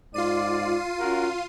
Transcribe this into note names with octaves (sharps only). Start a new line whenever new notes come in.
G#2 F4 D5 C7 D#7
C#4 F#4 A#4